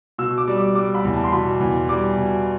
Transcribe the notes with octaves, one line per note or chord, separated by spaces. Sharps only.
B2 E6
D6
G3
D6
G3 D6
B5
E2
A5
C6
B2 B5
E2
G3 D6
B2